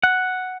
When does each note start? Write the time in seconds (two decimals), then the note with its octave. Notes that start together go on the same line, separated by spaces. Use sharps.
0.04 F#5